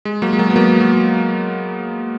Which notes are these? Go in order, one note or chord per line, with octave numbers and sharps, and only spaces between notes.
G#3
F#3 A#3
G#3
F#3 A#3
B3
F#3 A#3
F#3